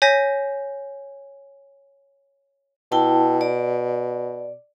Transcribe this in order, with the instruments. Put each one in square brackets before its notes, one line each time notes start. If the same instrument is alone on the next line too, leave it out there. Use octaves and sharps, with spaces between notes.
[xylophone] C#5 G#5 G6 A#6 B6
[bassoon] B2 [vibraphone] E4 G5 A5
[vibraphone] D5